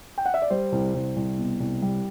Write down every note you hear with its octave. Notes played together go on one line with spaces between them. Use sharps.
G5
F#5
E5
D5
G3 C5
C2
C2
C2
B2
C2
G3